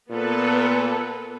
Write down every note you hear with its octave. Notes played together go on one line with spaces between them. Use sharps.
A#2 B3 A4 B4